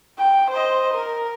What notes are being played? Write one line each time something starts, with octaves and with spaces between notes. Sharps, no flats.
G5
C5 D#5
A#4